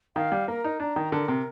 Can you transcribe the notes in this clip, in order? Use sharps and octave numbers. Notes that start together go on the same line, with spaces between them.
D#3 F5
G3
A#3 A#4
D#4
D4 A#5
D#3
D3 A#4
C3